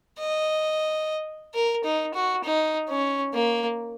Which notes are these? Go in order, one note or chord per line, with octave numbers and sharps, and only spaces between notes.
D#5
A#4
D#4
F#4
D#4
C#4
A#3